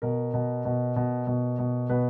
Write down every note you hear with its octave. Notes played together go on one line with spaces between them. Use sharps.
B2 A#4
B2
B2
B2
B2
B2
B2 B4